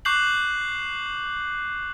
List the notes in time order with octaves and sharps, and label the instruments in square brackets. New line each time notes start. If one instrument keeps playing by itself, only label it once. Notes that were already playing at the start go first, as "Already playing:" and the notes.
[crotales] C#6 D6 F#6 G6 C7 F#7